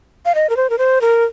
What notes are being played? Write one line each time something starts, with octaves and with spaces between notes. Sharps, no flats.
F5
D#5
A#4
C5
A#4
C5
A#4